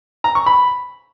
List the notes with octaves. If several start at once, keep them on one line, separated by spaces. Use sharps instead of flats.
A#5
C#6
B5